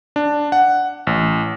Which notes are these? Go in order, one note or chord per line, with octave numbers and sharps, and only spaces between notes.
D4
F#5
A1